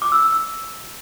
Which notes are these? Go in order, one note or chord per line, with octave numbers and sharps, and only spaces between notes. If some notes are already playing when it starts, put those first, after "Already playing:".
D6
E6
E6
E6